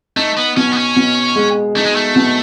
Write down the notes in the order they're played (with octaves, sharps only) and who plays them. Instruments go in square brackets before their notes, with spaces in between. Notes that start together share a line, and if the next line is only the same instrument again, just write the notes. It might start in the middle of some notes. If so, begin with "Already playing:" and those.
[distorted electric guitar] A3 [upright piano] D#4
[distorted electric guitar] B3
[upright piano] B2 [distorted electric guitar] C#4
[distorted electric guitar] B3
C#4
[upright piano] B2
G#3
[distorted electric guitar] A3 [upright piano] D#4
[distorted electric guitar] G#3
A3
[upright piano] B2